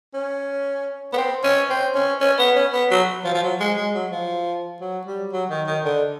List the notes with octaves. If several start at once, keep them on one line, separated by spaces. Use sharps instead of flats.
C#4
B3
C4
C#4
C4
C#4
C#4
B3
C#4
B3
F#3
F3
F3
F#3
G#3
G#3
F#3
F3
F#3
G3
F#3
D#3
D#3
D3